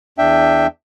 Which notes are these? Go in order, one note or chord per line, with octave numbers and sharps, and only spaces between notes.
E2 D4 E5 G5